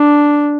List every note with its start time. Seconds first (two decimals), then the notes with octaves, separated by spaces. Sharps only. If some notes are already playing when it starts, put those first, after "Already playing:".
Already playing: D4